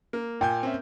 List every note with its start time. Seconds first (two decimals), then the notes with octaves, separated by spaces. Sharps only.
0.13 A#3
0.41 A#2 G5 G#5 G6
0.63 C4 C#4 E5